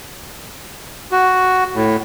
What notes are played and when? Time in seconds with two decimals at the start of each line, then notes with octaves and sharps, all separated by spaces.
1.12 F#4
1.75 A2